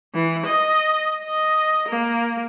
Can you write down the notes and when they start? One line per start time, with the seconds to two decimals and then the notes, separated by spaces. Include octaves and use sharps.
0.14 E3
0.46 D#5
1.24 D#5
1.88 A#3